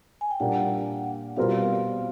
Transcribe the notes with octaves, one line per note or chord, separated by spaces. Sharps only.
G#5
G5
A#2 G3 A#3 D4 F#5
B2 G3 C4 F4 A#4 F5